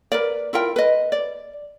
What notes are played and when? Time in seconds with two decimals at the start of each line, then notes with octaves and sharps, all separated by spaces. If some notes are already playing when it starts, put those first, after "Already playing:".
0.12 A#4 B4 D5
0.53 E4 F4 A#4 G5
0.76 B4 D#5
1.12 D5